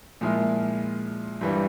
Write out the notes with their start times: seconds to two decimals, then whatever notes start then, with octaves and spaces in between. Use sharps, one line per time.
0.21 A#2 F3 G#3 E4
1.41 G2 E3 G3